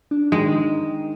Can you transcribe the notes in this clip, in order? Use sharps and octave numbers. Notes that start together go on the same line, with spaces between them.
D4
D#3 G#3